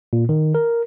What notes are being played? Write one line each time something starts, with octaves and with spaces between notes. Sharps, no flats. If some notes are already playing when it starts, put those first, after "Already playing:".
A#2
D#3
A#4